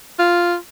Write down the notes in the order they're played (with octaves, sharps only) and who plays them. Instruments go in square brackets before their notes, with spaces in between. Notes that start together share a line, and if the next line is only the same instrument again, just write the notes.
[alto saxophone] F4